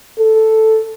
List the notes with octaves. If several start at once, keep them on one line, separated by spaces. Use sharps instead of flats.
A4